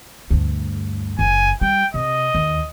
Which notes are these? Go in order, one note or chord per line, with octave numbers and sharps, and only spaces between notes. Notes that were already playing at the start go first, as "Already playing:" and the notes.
D2 G2
F#1 G#5
G3 G5
C3 D#5
D#2